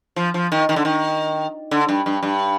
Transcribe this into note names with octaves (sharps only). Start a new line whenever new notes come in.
F3
F3
D#3
D#3
D3
D#3
D3
G2
G2
G2